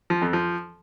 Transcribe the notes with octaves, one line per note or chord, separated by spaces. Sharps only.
F3
F2
F3